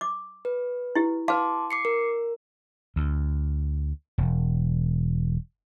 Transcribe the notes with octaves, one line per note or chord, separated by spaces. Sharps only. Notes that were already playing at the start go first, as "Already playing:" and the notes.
D6
B4
E4 G4
B4 F5 A5 C6 D6
D6 C7 C#7
A#4
D2
E1